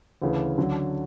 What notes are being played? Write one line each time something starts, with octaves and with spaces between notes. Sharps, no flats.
D2 C#3 E3
D3 F#3 C#4